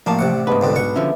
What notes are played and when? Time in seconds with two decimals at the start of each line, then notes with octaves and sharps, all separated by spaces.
0.06 A1 F3 A#3 D5 A5 C#6
0.19 A1 C3 F#5
0.47 G#2 G#3 B3 D4 B4
0.61 C2 F2 D3
0.76 B1 F#5 C#6
0.95 D3 F3 C#4 E5